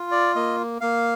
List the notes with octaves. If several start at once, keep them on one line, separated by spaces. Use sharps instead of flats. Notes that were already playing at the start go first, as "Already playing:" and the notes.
Already playing: F4
D5
A#3 D#5
A#3 F5